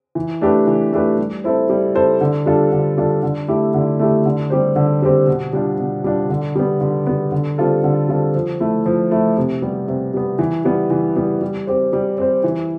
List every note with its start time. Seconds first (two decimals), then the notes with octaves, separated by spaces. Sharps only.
0.15 E3
0.41 A3 D4 G4 B4
0.67 E3
0.93 A3 D4 G4 B4
1.18 G3
1.44 C4 E4 A4 C5
1.69 G3
1.94 C4 E4 A4 C5
2.21 D3
2.46 G3 D4 F4 A4
2.72 D3
2.98 G3 D4 F4 A4
3.23 D3
3.48 A3 E4 G4
3.74 D3
3.99 A3 E4 G4
4.25 D3
4.50 G3 C4 G4 C5
4.76 D3
5.02 G3 C4 G4 C5
5.27 B2
5.53 G3 D4 F4
5.79 B2
6.04 G3 D4 F4
6.29 D3
6.55 G3 B3
6.81 D3
7.07 G3 B3
7.32 D3
7.58 G3 C4 F4 A4
7.84 D3
8.09 G3 C4 F4 A4
8.34 F3
8.60 A3 E4
8.86 F3
9.11 A3 E4
9.37 C3
9.62 G3 B3
9.88 C3
10.14 G3 B3
10.39 E3
10.65 G3 B3
10.90 E3
11.16 G3 B3
11.42 G3
11.67 C4 G4 C5
11.93 G3
12.18 C4 G4 C5
12.44 E3